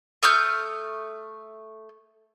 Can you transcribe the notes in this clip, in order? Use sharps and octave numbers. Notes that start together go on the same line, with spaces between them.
A3 D#6 F6 G6